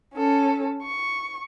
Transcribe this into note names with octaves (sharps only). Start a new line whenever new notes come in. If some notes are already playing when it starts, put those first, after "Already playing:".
C#4 A4
C#6